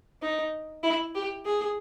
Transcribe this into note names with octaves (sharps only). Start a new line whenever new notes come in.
D#4
E4
G4
G#4